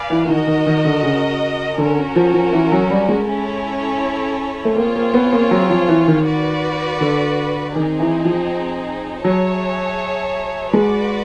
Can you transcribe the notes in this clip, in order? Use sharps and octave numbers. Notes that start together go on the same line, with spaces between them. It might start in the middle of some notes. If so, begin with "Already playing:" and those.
Already playing: B4 D5 F5 G#5
E3
E3
D#3 F#4 A#4 D#5
D#3
D#3
D3
C#3
D3 C#4 F#4 A#4
F3
F3
E3
F#3
G3
G#3
C#4 E4 A4 C#5
A3
A#3 C4 F4 G#4 C#5
A#3
B3
A#3
F#3
F3
E3
D#3
F#4 B4 D5
D3
D#3 C4 D#4 G#4
E3
F3
F#3 G#4 C#5 E5 A5
G#3 F#4 B4 D5